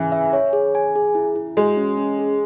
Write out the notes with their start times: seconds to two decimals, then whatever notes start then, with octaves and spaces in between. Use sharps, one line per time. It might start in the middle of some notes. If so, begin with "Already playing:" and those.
Already playing: C#3 E3
0.12 E5
0.33 C#5
0.53 G#4
0.75 G#5
0.95 G#4
1.15 E4
1.36 E4
1.57 G#3 F#4
1.77 C#4
1.97 C#4
2.19 G#4